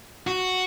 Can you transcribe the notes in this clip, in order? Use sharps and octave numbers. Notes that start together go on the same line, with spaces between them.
F#4